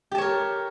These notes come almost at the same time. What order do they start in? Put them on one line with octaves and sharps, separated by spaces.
G4 A5 C#5 A#4